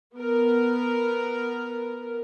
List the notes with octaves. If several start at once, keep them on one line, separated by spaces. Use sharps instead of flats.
B3 A#4